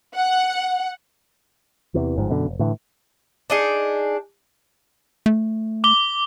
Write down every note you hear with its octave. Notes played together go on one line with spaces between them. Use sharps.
F#5
E2 C3 E3
G1 G#2 F3
F#2 B2 D3
F1
A2 D3 E3
D4 D#4 G#4
A3
D6 G7